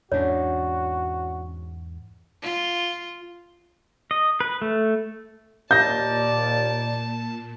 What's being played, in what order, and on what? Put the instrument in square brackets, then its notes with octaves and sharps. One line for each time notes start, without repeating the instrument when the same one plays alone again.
[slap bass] E2 G#2 [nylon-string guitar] C#4 D4 E4 [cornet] F#4 [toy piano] C#5
[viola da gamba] F4
[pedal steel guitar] D#5
B4
A3
[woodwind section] D#2 D5 [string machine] A#2 [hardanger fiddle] A5 [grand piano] G6 A#6